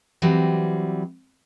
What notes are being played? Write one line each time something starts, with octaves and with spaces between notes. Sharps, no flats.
E3 F#3 G3 C4